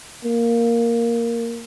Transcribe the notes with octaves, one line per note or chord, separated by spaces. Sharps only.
A#3